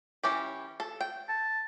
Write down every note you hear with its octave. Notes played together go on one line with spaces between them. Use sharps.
E3 C#4 G4
A4
G5
A5